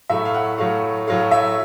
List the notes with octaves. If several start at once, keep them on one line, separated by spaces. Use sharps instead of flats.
A2 F#3 A3 E5
F5
F#5
A2 F#3 A3 F5
A2 F#3 A3 F5
E5